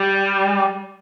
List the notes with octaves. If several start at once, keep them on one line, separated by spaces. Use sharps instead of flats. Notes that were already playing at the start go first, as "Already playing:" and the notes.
Already playing: G3